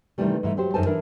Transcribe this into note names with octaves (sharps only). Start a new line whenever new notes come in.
C3 D#3 E3 G3 A3
G#2 E3 A3
F#3 G4 C5
F#2 D#3 A4 C5 G#5 A5
E3 D4 A#4